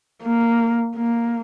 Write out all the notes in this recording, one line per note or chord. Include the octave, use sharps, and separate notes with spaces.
A#3
A#3